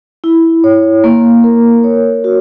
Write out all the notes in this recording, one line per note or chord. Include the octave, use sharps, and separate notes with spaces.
E4
C#5
A#3
A#4
C#5
F#4